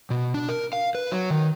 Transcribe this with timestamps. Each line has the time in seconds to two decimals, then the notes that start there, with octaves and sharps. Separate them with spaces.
0.10 B2
0.34 D4
0.49 A#4
0.73 F5
0.95 B4
1.12 F#3
1.31 D#3